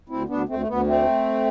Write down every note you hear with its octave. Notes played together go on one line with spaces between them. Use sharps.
D2 C4 E4
D2 B3 D4
D2 A3 C4
A3
D2 B3
D3 A3 C4